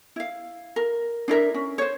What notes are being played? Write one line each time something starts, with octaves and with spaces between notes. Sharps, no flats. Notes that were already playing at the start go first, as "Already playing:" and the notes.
E4 F5
A#4
D4 E4 A#4 E5
C#4
C5 C#5